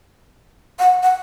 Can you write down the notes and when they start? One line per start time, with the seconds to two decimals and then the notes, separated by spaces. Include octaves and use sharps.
0.79 F#5
1.03 F#5